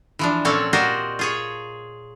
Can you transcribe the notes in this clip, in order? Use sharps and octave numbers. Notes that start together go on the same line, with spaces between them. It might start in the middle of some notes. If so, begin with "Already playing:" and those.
E3 F3 D4
A#2 C4 C#4 A4 C#5 D5
F#4 G4 A#4 C5 D5 D#5
F4 G#4 C#5